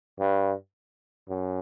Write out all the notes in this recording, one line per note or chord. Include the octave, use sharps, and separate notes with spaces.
G2
F#2